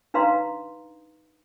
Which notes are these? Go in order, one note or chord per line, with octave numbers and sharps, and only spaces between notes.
D4 D#4 B4 F5 A#5 C6